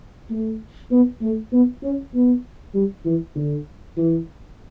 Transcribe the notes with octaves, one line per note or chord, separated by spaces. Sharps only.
A3
B3
A3
B3
C#4
B3
G3
E3
D3
E3